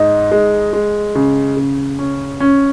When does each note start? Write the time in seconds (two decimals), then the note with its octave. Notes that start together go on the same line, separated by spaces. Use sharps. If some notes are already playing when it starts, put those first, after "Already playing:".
Already playing: G#2 D#4
0.31 G#3
0.73 G#3
1.15 C#3
1.57 C#3
1.99 C#4
2.40 C#4